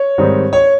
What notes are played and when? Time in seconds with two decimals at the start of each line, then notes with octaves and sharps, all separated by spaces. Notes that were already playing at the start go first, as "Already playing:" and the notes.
Already playing: C#5
0.18 G#2 D#3 G3 C4 D#4
0.53 C#5